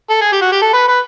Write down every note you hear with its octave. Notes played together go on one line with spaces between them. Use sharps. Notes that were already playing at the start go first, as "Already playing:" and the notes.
A4
G#4
G4
F#4
G4
A4
B4
B4